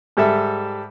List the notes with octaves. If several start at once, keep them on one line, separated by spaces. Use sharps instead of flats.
G#2 G3 A4 E5